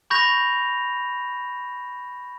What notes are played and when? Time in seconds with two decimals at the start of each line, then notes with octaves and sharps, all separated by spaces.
0.10 B5 C#6 G6 A#6 F7